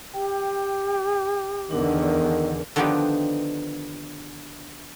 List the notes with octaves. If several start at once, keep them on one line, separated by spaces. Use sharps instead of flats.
G4 G5
E2 D3 D#3 D4 A#4
D3 D#3 F3 B3 D#4 G4